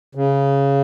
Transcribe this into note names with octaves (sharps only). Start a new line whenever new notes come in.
C#3